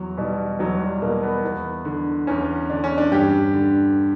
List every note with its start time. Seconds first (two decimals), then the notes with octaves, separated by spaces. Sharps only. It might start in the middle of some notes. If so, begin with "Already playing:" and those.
Already playing: E2 F#3
0.17 B2 G3
0.59 E2 F#3
0.81 G3
1.02 B2 A#3
1.23 B3
1.44 E2
1.85 D3
2.27 E2 C#4
2.70 D3 D4
2.84 C#4
2.98 D4
3.12 G2 G4
3.54 D3